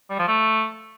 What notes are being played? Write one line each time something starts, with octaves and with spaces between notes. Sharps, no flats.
G3
F3
A3